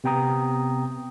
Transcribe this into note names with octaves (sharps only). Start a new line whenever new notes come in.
C3 B3 G5 A#5 D#6